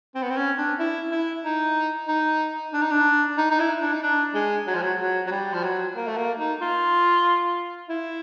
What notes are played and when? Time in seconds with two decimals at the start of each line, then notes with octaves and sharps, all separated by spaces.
0.15 C4
0.22 B3
0.30 C4
0.37 C#4
0.58 D4
0.79 E4
1.11 E4
1.45 D#4
2.08 D#4
2.73 D4
2.82 D#4
2.91 D4
3.38 D#4
3.51 D#4
3.60 E4
3.80 D4
3.93 D#4
4.03 D4
4.34 G#3
4.67 F#3
4.75 F3
4.82 F#3
4.99 F#3
5.27 F#3
5.31 G3
5.54 F3
5.64 F#3
5.96 A#3
6.08 A3
6.17 A#3
6.39 D#4
6.61 F4
7.89 E4